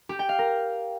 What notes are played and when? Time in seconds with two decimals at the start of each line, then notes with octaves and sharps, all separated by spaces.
0.09 G4
0.19 G5
0.29 F5
0.39 A#4